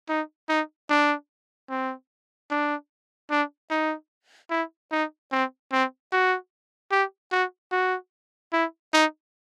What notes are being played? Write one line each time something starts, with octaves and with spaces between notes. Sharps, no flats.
D#4
D#4
D4
C4
D4
D4
D#4
E4
D#4
C4
C4
F#4
G4
F#4
F#4
E4
D#4